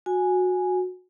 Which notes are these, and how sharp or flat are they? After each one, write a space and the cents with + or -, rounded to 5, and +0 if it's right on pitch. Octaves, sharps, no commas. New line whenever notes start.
F#4 -20 G#5 +0